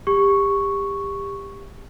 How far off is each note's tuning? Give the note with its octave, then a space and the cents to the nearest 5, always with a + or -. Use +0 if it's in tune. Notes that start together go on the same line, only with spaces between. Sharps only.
G4 +25 C#6 +0